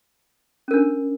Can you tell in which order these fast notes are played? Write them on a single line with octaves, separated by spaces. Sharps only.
C#4 A#4 D4